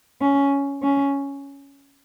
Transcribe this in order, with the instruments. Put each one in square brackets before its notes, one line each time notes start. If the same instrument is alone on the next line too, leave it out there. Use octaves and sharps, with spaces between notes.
[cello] C#4
C#4